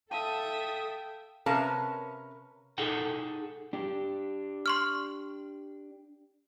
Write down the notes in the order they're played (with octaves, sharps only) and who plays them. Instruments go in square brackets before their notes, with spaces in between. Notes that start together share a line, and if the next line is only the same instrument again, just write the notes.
[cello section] A4 [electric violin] E5 D#6 [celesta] F5 A5 D#7 [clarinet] G5
[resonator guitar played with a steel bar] C3 C#4 A#4 B4 F5 A5
[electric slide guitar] D#4 G#4 A4 F#5 G5
D4 G4
[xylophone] C6 C#6 F6